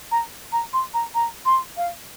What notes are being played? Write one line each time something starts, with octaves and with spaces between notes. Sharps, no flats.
A#5
A#5
C6
A#5
A#5
C6
F5